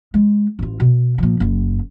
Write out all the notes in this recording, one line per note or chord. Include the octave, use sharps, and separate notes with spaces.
G#3
A1 F4
B2
A#2 F3
F#1 F#2